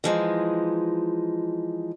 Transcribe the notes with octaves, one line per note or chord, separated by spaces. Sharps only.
E3 F3 G#3 D#4